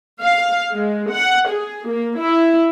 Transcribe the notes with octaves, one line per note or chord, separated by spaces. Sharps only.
F5
G#3
F#5
G#4
A#3
E4